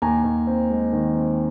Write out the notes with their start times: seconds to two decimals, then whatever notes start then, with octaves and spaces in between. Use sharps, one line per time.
0.02 D#2 G#5 A#5
0.24 D#2
0.47 C4
0.70 G#3
0.93 D#3
1.15 C4